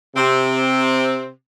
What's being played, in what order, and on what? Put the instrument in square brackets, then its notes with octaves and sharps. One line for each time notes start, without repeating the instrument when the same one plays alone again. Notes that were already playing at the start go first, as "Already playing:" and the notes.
[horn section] C3 C4